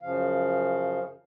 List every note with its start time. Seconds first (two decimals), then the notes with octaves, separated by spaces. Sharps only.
0.02 F#2 C#3 F3 F5